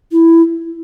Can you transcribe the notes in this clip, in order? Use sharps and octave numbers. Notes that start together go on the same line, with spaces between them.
E4